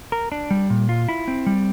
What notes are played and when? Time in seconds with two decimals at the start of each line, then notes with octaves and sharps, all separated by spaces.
0.12 A#4
0.32 D4
0.51 G3
0.70 A#2
0.89 F4
1.09 E4
1.28 C4
1.46 G3